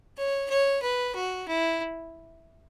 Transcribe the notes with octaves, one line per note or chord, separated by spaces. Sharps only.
C#5
C#5
B4
F#4
E4